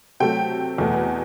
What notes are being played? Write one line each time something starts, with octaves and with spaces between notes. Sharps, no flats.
C3 F#3 A3 G5
E2 B2 A3